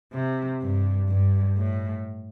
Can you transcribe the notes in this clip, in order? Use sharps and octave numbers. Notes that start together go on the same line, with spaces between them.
C3
G2
G2
A2